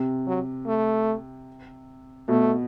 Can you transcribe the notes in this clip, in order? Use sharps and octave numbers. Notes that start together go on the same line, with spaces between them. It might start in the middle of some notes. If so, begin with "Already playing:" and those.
Already playing: C3
F#3
A3
B2 A3